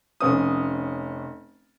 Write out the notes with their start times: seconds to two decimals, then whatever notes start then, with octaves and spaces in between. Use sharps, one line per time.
0.20 F1 C#4 D#6